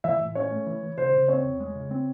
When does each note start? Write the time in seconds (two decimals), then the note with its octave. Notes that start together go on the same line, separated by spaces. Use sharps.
0.04 E3 E5
0.20 A2
0.35 C#4 C#5
0.51 A3
0.66 E3
0.83 E3
0.98 C#3 C5
1.13 C#3
1.28 C4 C#5
1.44 E2
1.60 G#3
1.75 C#3
1.91 C4